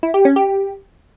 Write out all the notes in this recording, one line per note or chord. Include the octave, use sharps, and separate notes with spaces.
E4
G4
C#4
G4